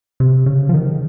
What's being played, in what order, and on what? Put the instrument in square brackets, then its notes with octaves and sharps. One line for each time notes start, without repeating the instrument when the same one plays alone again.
[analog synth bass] C3
C#3
F3
D#3